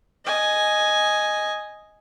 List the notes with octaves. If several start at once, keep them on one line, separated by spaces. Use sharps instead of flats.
D#5 G#5